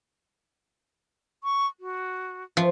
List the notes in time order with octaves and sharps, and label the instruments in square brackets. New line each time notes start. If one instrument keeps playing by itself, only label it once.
[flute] C#6
F#4
[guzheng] F3 [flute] E5